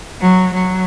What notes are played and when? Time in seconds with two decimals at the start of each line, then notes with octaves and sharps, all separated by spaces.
0.21 F#3
0.53 F#3